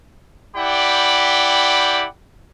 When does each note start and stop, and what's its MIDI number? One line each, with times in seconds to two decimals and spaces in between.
0.56 2.06 64
0.56 2.06 67
0.56 2.06 74
0.56 2.06 78
0.56 2.06 79
0.56 2.06 83